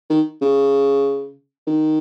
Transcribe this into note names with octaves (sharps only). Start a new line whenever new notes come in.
D#3
C#3
D#3